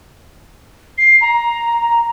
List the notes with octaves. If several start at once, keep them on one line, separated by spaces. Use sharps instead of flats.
C7
A#5